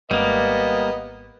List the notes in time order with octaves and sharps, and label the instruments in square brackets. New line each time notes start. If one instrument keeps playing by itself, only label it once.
[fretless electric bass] G#1 [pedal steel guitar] G3 A#3 [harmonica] B3 D#5